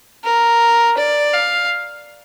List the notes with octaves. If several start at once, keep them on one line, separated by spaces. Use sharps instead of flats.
A#4
D5
F5